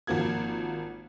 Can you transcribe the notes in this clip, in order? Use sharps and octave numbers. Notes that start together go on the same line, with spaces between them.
G#1 F3 A#3 F#4 G#6